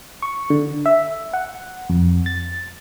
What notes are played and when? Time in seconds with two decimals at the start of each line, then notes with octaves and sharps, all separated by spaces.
0.22 C#6
0.50 D3
0.86 E5
1.33 F#5
1.90 F2
2.26 A6